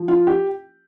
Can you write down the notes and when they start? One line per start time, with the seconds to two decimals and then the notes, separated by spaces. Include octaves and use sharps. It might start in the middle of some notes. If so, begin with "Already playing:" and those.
Already playing: F3
0.08 F4
0.27 G4